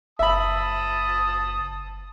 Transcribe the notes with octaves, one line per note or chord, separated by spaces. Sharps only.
F#1 E5 A5 B5 D#6